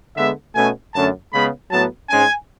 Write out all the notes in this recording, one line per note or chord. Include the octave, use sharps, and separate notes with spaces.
D3 G#3 B3 E5
B2 A3 C#4 G#5
F#2 D3 A3 C#4 A5
C#3 G#3 B3 B5
A2 F#3 B3 A5
G#2 G#3 C#4 G#5